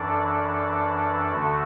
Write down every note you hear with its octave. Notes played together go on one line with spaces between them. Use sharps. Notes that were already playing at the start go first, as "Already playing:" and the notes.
Already playing: F#2 E3 D4 A4 D5
D2 D3 A3 F#4 A4